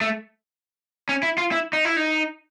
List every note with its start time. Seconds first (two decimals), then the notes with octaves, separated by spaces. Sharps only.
0.01 A3
1.09 C#4
1.23 E4
1.38 F4
1.52 E4
1.73 D#4
1.85 E4
1.97 D#4